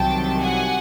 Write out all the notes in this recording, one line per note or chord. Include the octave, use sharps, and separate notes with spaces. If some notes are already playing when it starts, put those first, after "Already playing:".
Already playing: C2 C3 D#3 F#3 G5 A5
F#5 G#5